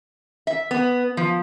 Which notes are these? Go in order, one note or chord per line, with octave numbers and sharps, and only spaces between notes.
E5
B3
F3